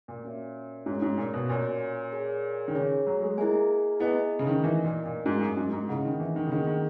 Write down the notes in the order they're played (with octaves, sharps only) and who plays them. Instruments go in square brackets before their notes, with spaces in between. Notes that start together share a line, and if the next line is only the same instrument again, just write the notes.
[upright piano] A#2
[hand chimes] A#3 C#4 F#4 C#5 E5
[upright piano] G#2 [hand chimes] C#4 F#4 C#5 G#5
[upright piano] G#2
A#2
B2
[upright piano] A#2 [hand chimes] C#4 F#4 C#5 G#5
[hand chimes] G#4 C#5 G#5
[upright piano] D#3
[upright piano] C#3 [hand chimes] G#4 C#5 G#5
[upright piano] F#3
G#3
[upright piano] A#3 [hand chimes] E4 G#4 D#5 G#5
[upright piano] B3 [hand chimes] E4 G#4 D#5 G#5
[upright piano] C#3
D#3
[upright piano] E3 [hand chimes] D#4 A#4 D#5
[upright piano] A#2
A#2
[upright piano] G#2 [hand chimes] D#4 A#4 D#5
[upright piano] F#2
G#2
G#2
[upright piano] C#3 [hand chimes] A#3 E4 G#4 D#5 F#5
[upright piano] D#3
E3
D#3
C#3
[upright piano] D#3 [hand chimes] A#3 E4 G#4 D#5 F#5
[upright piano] D#3